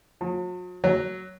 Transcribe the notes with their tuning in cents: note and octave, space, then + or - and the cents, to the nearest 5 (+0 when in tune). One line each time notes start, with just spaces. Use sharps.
F#3 -40
F#3 +10